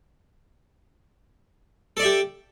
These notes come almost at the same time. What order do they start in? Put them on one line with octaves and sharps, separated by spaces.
A4 D5 E5 G4